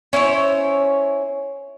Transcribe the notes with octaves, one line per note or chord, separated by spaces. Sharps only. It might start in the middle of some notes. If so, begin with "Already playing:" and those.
C#4 E4 C5 C#5